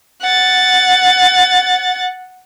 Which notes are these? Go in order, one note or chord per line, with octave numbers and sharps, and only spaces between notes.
F#5 A6